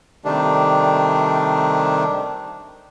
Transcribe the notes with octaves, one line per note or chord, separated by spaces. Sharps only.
C3 D#3 G3 A3 D4